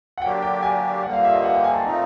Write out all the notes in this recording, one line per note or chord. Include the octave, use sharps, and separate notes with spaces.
F#5
D3 F#3 A#3 D4 G4 G5
G5
G#5
G2 D3 F3 A#3 F#5
F5
E5
D#5
F#5
G5
G#5
A5
A#2 F3 A3 C4 D#4 A#5